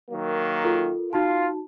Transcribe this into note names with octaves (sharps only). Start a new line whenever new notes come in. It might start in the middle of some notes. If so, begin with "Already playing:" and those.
D#3 F#3 A#3
F4 A4 A#4
D#4 F4 F#4 A5